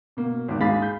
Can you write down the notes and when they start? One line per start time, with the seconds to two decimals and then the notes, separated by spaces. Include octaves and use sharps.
0.17 B2 A#3
0.48 G#1 D#2 D6
0.60 G#2 G#4 F5 B5 A6 B6
0.82 G6